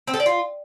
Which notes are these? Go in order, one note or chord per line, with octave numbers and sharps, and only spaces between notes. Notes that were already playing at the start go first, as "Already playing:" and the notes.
C4
A4
D5
F4